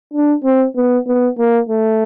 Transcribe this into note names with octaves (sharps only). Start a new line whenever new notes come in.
D4
C4
B3
B3
A#3
A3